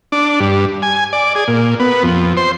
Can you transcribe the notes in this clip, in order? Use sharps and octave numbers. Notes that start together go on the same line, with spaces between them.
D4
G2
G#5
D5
G#4
A#2
B3
F2
C5